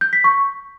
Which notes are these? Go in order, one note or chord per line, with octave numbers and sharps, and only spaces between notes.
G6
B6
C#6